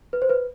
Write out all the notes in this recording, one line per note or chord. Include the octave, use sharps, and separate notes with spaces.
B4
C5
B4